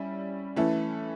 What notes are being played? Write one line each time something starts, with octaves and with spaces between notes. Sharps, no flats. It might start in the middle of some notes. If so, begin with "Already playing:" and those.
Already playing: G3 C#4 E4
E3 A3 C#4 E4 A4